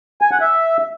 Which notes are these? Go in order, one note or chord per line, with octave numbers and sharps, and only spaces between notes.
G#5
F#5
E5